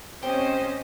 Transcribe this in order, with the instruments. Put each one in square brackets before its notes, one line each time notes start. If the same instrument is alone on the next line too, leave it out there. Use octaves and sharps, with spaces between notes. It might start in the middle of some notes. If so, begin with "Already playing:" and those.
[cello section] C4 C#4 D#5 [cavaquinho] G4 [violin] C5